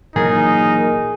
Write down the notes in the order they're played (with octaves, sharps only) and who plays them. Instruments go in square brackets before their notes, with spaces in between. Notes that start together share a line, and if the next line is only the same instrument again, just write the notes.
[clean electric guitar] A#2 E3 F#3 [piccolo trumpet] D#4 [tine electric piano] G#4 [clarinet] A#4